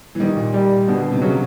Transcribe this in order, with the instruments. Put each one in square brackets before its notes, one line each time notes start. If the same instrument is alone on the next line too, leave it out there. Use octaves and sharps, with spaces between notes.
[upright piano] E3
[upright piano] D#3 [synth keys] G3
[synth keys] A#2
G3
A#2
[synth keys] B2 [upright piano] D3
[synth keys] B2
[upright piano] C3
[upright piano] C#3 [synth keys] F#3